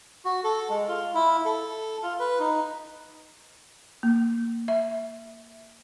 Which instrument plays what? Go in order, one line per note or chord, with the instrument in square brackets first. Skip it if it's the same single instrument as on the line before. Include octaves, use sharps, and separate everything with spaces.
[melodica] F#4
A4
G#3
F4
E4
A4
F4
B4
D#4
[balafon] A#3
E5